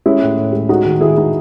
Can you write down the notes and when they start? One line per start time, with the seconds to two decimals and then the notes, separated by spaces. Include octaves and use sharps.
0.06 G#3 C#4 E4
0.22 A2
0.37 A2
0.53 G#3
0.69 G#3 D#4 F#4
0.85 D#3
1.00 D#3 E4 G#4
1.17 G#3 D#4 F#4